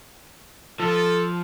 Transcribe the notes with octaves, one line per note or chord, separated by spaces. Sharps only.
F3 A4